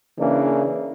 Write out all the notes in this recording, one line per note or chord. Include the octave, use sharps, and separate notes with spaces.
C#3 E3 A#3 D4